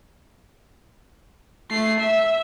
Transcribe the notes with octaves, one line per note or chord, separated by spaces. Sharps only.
A3 C7
E5